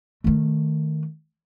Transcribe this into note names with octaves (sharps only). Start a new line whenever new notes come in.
D#3 A3